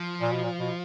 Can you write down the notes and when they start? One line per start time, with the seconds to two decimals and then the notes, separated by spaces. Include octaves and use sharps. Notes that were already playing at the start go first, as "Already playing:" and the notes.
Already playing: F3
0.22 A#2
0.32 B2
0.44 A#2
0.59 B2